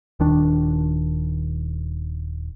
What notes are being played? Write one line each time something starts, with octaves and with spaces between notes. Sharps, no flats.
D#1 D#3 D4